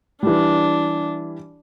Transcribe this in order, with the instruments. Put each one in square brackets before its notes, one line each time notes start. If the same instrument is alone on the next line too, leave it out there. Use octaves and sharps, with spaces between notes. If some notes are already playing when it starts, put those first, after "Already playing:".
[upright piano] E3 G3 [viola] D4